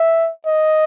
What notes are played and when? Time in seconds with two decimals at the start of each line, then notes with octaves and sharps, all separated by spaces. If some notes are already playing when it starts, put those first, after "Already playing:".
Already playing: E5
0.46 D#5